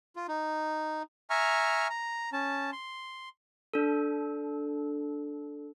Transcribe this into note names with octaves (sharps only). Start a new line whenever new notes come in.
F4
D#4
E5 G#5 A#5 C#6 F6
A#5
C#4 A5
C6
D4 A4